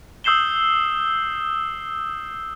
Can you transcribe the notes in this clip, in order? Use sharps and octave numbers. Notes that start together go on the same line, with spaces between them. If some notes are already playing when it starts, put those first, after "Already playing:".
D#6 E6 G6 C7 E7 G7